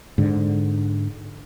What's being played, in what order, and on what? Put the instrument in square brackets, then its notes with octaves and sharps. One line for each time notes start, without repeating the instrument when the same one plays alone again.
[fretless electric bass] G#2 D3